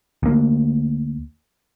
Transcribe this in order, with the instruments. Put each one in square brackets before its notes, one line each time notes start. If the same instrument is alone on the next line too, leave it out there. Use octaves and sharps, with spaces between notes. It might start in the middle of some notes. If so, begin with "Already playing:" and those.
[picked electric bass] D2 A#3